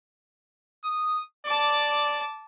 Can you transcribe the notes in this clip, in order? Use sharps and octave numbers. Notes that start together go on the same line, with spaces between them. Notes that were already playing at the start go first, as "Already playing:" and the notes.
D#6
D5 A5 D6